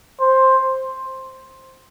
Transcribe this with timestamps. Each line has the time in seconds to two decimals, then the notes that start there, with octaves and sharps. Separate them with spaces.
0.21 C5